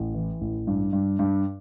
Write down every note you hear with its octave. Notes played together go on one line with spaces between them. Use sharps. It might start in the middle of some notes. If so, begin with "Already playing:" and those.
Already playing: A1
E3
A1
G2
G2
G2